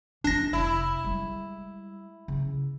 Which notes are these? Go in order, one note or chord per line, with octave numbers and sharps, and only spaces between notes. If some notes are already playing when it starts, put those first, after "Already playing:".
F3 D4 D#4 A#6
F1 E4
G3 G#3
C#3